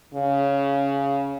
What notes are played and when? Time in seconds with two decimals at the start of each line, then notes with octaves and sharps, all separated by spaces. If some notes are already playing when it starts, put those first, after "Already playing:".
0.14 C#3